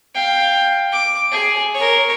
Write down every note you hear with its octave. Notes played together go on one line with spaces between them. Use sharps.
F5 G5
D6
G#4
A#4 C#5